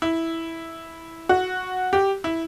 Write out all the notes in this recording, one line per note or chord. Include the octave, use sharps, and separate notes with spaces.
E4
F#4
G4
E4